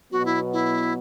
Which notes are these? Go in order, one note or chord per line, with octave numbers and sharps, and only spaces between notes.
B2 F#3 B3 F#4
E4
E4